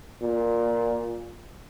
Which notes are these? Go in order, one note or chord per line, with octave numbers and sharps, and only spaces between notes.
A#2